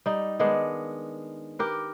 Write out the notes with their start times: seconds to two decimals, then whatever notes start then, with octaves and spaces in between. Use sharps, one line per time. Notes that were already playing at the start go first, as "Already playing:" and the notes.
0.06 G3 D#4
0.39 D#3 G#3 B3 D4
1.59 G4 A#4 B4